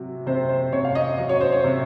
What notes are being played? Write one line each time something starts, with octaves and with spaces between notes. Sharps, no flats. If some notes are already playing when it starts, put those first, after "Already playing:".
Already playing: C3 F#3
C3 C5
C5
C3 C#5
F5
D#5
F#3 D#5
C#5
C5
C#5
C3